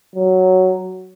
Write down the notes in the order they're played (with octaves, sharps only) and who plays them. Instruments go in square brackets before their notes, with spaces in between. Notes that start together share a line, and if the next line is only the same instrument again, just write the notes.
[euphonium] F#3